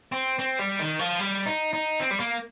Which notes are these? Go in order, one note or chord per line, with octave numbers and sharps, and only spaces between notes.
C4
C4
G3
D#3
F3
G3
D#4
D#4
C4
G3
A#3